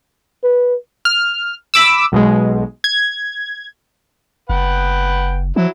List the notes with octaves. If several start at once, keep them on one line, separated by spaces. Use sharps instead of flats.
B4
F6
B5 D6 E6
B1 B2 G#3
G#6
F#1 B4 F#5 G5
F3 F#3 E4